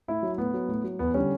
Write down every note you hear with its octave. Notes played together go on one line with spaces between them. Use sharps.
A2 E4
F#3
A2 B3
F#3
A2
F#3
E2 B3
D3 G3 C#4